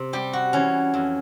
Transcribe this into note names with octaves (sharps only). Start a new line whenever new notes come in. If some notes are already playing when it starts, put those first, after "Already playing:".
Already playing: C3
G3 G4
F#4
E3 C#4
F2